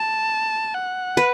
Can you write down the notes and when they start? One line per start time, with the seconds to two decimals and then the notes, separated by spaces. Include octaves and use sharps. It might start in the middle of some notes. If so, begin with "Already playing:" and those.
Already playing: A5
0.74 F#5
1.17 B4